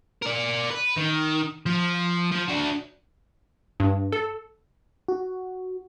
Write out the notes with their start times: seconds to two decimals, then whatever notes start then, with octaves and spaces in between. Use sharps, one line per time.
0.22 A#4 D5
0.71 B4
0.98 D#3
1.66 F3
2.32 F3
2.49 D4 F#4
3.80 G2
4.12 A4
5.08 F#4